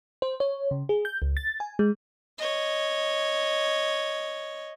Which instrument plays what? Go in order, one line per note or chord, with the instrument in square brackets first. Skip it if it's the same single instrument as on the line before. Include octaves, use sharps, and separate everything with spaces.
[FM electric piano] C5
C#5
C#3
G#4
G6
C#2
A6
G#5
G#3
[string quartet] C#5 D#5